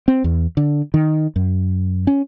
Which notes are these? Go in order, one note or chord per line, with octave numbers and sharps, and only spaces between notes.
C4
E2
D3
D#3
F#2
C#4